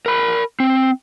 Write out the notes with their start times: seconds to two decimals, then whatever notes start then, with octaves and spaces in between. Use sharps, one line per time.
0.06 A#4 B5
0.60 C4